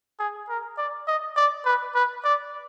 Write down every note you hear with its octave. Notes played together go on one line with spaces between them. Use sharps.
G#4
A#4
D5
D#5
D5
B4
B4
D5